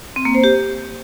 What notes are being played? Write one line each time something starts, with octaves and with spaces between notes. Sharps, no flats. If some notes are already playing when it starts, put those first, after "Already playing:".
C4
A#3
C5
G4